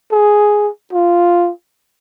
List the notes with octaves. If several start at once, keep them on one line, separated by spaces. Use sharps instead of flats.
G#4
F4